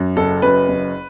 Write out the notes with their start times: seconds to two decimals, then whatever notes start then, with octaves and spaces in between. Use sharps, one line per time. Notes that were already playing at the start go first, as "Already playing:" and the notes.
Already playing: F#2
0.17 F#1 A4
0.42 F#2 B4
0.69 F#1